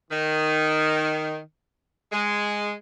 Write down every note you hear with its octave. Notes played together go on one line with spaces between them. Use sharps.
D#3
G#3